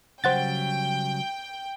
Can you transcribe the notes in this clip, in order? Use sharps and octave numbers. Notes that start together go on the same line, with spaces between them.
C#3 F#3 G3 C5 F#5 G5 A6